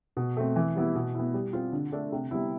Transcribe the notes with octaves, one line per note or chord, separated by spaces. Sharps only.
B2
A3 C4
E3
G3 B3 E4
B2
B3 E4
G3
C4 F4
D3
A3 D4 A4
C3
G3 B3 E4